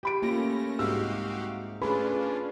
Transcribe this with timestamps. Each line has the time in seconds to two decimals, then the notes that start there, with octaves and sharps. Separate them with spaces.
0.03 G4 B5 D7
0.22 A3 A#3 C#4 F4 A#6
0.79 C2 G#2 F#4 G4 F5 E6
1.82 A3 C#4 D4 F4 G#4 B4 B5